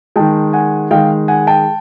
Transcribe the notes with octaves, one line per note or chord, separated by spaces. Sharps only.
D#3 G#3 G5 A5
F#5 G#5
D#3 G#3 F5 G5
F#5 G#5
G5 A5